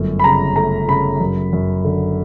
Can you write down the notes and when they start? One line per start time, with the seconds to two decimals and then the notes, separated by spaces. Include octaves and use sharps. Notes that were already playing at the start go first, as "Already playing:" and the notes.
Already playing: G1 F#2 A3
0.19 B5
0.24 C#3 A#5
0.56 A3 A#5
0.88 C#3 B5
1.20 F#2
1.53 F#2
1.84 D3